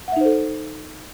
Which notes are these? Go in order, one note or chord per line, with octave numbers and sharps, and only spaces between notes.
D#4 A4 C5 E5 F#5